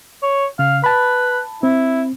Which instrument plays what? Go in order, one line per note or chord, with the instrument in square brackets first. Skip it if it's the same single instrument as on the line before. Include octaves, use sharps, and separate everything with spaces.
[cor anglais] C#5
[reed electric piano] C#3 [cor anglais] F5
[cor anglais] B4 [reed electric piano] A5 B5
[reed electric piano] C4 [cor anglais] E4